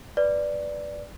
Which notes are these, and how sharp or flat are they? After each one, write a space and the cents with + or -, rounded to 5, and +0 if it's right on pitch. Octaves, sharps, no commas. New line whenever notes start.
B4 +0 D5 +0